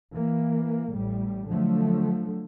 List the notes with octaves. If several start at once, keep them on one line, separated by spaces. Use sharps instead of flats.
E3 A#3
A1 A2 G3
D3 F3 F#3 A3